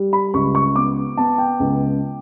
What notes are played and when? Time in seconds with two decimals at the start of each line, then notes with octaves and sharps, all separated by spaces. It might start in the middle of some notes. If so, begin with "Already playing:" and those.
Already playing: G3
0.13 B5
0.34 C#2 C#6
0.55 C#6
0.76 B3 D6
1.17 B3 A5
1.38 G5
1.60 C#2